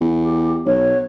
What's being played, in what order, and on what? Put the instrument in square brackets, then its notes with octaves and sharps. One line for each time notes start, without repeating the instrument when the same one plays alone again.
[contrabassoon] E2
[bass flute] G4
[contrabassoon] B1 [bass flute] C#5